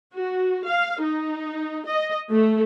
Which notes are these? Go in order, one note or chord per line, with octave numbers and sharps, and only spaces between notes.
F#4
F5
D#4
D#5
A3